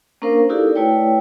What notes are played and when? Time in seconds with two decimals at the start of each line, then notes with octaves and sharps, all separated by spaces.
0.22 A#3 C#4 D4 A#4 C5 F5
0.49 D#4 E4 F#4 G4 A4 D5
0.75 A3 E4 B4 C#5 D5 G5